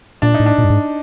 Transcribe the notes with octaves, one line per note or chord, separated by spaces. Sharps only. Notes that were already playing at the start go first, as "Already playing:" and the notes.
A#2 D4
D#4
A2
D4
A#2
G2
G#2